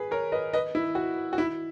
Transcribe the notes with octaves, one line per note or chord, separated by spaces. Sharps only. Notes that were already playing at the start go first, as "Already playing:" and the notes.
Already playing: G#4 B4
A#4 C#5
B4 D#5
B4 D#5
E4
F#4
F#4
E4